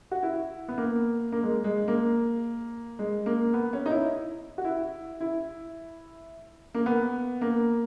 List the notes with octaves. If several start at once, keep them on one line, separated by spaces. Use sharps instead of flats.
F#4
E4
B3
A#3
A#3
G#3
G#3
A#3
G#3
A#3
B3
C#4
D#4
E4
F#4
E4
E4
A#3
B3
A#3